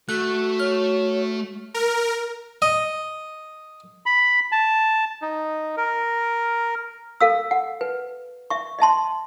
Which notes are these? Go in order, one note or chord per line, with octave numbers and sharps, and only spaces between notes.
A3 F#4 F#6
C#5 F6
A#4
D#5
B5
A5
D#4
A#4
A4 F5 E6
F#5
B4
E5 C#6
D#5 E5 A5 C6